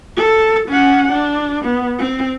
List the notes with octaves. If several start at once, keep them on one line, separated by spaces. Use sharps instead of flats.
A4
C#4 F#5
D4
B3
C4